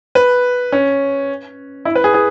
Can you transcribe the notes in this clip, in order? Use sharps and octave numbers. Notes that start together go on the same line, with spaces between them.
B4
C#4
E4
B4
G#4
G#4